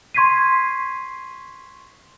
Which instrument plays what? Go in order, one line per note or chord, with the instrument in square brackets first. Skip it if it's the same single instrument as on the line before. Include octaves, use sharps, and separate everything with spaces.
[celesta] C6 C#6 G#6 B6 C7 D#7